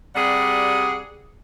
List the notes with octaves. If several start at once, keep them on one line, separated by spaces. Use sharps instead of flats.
C3 G3 G#4 D5 F#5